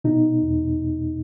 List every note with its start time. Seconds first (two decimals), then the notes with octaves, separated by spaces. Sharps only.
0.04 B2 D#4
0.42 E2